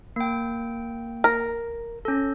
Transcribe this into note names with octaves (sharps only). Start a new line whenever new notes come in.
A#3 G5
A#4
C#4 A4